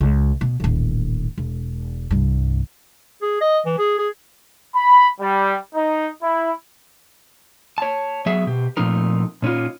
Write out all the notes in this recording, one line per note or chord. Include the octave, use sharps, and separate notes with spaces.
C#2
B2
D#1 A1
E1
C2 G2
G#4
D#5
E3
G#4
G#4
B5
G3
D#4
E4
C#5 A5
F#3 B3 G#4 E5
B2 G4
A#2 F3 A3 C4 D#4 A#4
A#2 C#4 D#4 F4